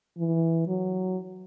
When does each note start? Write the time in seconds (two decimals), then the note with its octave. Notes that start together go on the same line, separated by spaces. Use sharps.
0.18 E3
0.67 F#3